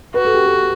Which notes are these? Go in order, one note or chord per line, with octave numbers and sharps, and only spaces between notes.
F#4 B4
A4
G4
A4